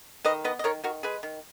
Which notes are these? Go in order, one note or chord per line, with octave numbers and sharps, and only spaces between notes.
D#3 B4 D#5
B3 B4 D#5
D#5
D#3 A#4 C#5
D#3 F#4 A#4
G#3 G#4 B4
D#3